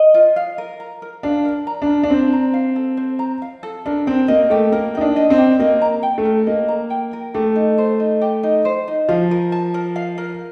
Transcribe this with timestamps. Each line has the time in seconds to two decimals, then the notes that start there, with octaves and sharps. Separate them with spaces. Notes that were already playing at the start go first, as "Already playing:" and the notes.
Already playing: D#5
0.14 F4
0.36 F5
0.58 A#4
0.80 A#5
1.02 A#4
1.23 D4 F5
1.45 A#4
1.67 A#5
1.82 D4
1.89 A#4
2.03 D4
2.10 C4 C5
2.33 A#5
2.54 F5
2.76 A4
2.97 C5
3.19 A#5
3.42 F5
3.63 A4
3.86 D4 A#4
4.07 C4 G5
4.28 A#3 D#5
4.50 A3 G4
4.72 A#3 A#4
4.95 D#4 G5
5.01 D4
5.16 D#5
5.30 C4
5.38 G4
5.60 A#3 D#5
5.82 A#5
6.03 G5
6.18 A3
6.25 A#4
6.47 A#3 D#5
6.68 A#5
6.90 G5
7.13 A#4
7.34 A3 G4
7.56 D#4
7.78 C5
8.00 D#4
8.21 G4
8.43 D#4
8.65 C5
8.88 D#4
9.09 F3 F5
9.31 A#4
9.52 A5
9.74 A#4
9.96 F5
10.18 A#4